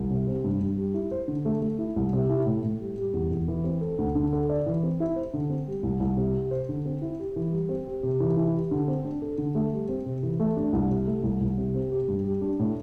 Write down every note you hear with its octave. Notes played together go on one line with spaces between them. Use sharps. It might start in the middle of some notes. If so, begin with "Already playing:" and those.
Already playing: C2
C3
C4
G2
G2
G3
E4
C5
D3
A3
A3
E4
C2
C3
E4
A2
A2
G3
G3
E2
E2
E3
C4
A4
D2
D3
A4
D5
E3
C4
E4
C5
D3
C4
G3
C2
C2
C3
G4
C5
D3
C4
E4
G4
E3
G3
C4
G4
C3
E3
E4
G4
D3
C4
D4
A4
D3
A3
G3
C4
C3
E3
A3
D4
C2
C3
A3
C2
C2
C3
C4
G4
G2
G3
D4
A2